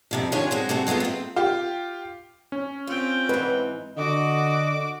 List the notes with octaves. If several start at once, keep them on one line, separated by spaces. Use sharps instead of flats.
F2 C3 F3
D#3 C#4 D4 F4 C#5 G#5
G#3 C4 F#4
C3 A3 C4 F#4
F#3 G#3 A3 B3 F4
C4 F4
F4 G4
C#4
C4 F4 G5
G#2 E3 B4
D3 F#4 D#5 D6